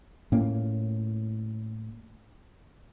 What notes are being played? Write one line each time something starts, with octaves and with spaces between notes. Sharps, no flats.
A2 A#3 C#4